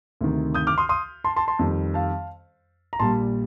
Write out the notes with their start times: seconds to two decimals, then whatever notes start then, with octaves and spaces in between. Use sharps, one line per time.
0.21 D2 C3 D#3
0.54 D#6 G6
0.67 D6 F6
0.78 C6 D#6
0.89 C6 D#6
1.24 A5 C6
1.36 A5 C6
1.48 A5 C6
1.59 F2 D#3 G3
1.94 F5 A5
2.93 A#5
2.99 A#1 A#2 G3 A5 C6